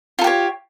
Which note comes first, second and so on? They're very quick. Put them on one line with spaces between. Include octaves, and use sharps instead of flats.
F4 A4 G4 C#5